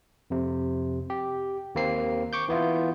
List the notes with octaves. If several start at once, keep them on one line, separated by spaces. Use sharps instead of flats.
F2 C3
G4
D#2 A#3 C4 C7
C#6 D6 G6
E3 B3 E4 F4